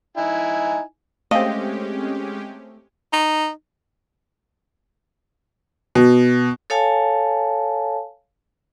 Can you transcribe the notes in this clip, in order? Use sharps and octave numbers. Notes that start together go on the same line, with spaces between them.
D#4 E4 G#5
G#3 A3 C4 C#4 G4 D#5 F5
D#4
B2
A4 C#5 F5 G#5 A5